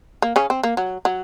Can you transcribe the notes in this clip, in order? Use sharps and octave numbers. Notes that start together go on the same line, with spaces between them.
A#3
C#3 C#4
C4
A#3
F#3
F#3